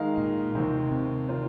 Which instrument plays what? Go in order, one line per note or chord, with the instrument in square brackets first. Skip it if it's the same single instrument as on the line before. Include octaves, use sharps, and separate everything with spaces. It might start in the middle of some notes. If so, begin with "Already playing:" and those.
Already playing: [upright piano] D#3 G#3 D#4 A#4 F5
[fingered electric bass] A#2
[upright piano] D#2 D#3 C4 [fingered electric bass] C3
[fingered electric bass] C3
[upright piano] D#3 A#3 F4 C5